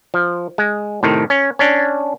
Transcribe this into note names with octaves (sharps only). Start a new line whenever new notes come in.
F3
G#3
A2 C3 D#3
C#4
C#4 D4